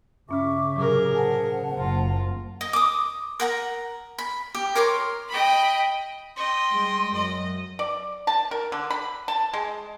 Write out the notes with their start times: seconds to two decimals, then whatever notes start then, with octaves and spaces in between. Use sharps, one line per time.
0.29 G2 C#3 C#4 E5 C#6 D6 F6
0.76 A2 C3 F#3 G#4 A#4
1.15 C5 F#5 G#5 A5
1.77 F#1 F4 A#5
2.61 D#5
2.73 D6 D#6
3.40 A#4 F#5 A#5
4.18 B5
4.55 G4
4.75 A#4 C#5 C6 D6
5.30 D#5 G5 B5
6.36 D#5 G5 C6
6.70 G3 G#3
7.14 F#2 F#3 D#5
7.79 D5
8.27 A5
8.51 A#4
8.72 D3
8.90 B5
9.28 A5
9.53 G#3